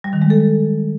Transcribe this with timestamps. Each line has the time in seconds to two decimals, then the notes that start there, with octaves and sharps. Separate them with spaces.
0.04 G3
0.13 D#3
0.22 G#3
0.30 A4